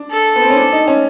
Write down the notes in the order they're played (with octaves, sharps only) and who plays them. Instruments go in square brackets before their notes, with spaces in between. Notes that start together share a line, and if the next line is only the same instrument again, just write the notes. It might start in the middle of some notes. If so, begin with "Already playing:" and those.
Already playing: [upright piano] D4
[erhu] A4
[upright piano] B3
C4
C#4
D4
D#4
C#4